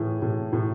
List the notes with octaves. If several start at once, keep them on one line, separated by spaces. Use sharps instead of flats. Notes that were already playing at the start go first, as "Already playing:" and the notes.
Already playing: A2 E3 G#4
A2
A2